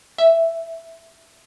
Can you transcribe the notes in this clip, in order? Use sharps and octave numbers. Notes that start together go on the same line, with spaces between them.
E5